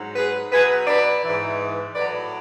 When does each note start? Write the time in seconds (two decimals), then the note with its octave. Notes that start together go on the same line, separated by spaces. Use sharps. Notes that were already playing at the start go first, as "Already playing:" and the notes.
Already playing: G#2 F#3
0.16 G#4 B4
0.51 B2 F#3 G#4 B4
0.87 B4 D5
1.23 G#2 E3
1.94 A2 F#3 B4 D5